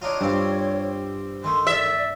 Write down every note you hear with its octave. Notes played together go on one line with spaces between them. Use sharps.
D4 D#4 F4 C#5
G2 G3 C4 F4
D#3 A3 C6
D5 E5